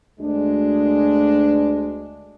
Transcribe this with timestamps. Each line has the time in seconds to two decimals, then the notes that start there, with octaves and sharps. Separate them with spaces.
0.19 D2 G#3 D4